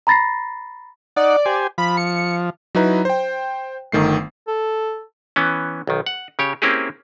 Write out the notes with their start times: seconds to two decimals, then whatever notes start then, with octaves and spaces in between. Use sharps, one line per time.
0.07 A#5 B5 A6 A#6 C7
1.17 D#4 D5 F#5
1.46 G4 C5 G#5
1.78 F3 B5
1.97 C#7
2.75 F#3 D#4 E4 B4 A#5
3.05 C5 G5
3.92 G1 D#3 A3 C7
4.47 A4
5.36 E3 B3 C#4
5.87 B1 D#3
6.06 F#5
6.39 C#3 G4 C#5
6.62 A#3 C4 C#4 E4 G4 G#4